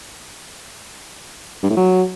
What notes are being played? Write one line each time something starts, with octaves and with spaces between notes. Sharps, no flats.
G2
A2
F#3